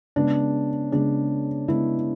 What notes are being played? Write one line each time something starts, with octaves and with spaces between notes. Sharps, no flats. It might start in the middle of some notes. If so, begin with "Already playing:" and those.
C#3 G#3 B3 D4
C#3 G#3 B3 D4
C#3 G#3 B3 E4